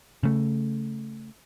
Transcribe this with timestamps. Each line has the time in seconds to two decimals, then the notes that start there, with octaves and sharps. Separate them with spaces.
0.23 C#3 A3